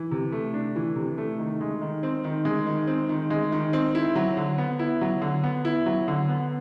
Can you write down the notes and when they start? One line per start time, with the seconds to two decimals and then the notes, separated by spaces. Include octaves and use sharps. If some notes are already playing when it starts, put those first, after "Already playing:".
Already playing: E3
0.11 C3
0.32 A3
0.54 D4
0.76 E3
0.96 C3
1.18 A3
1.39 D#3
1.61 G#3
1.82 D#3
2.03 C4
2.24 D#3
2.45 G#3
2.67 D#3
2.87 C4
3.09 D#3
3.30 G#3
3.52 D#3
3.73 C4
3.95 E4
4.15 F#3
4.37 D3
4.58 B3
4.79 E4
5.01 F#3
5.22 D3
5.43 B3
5.65 E4
5.86 F#3
6.08 D3
6.28 B3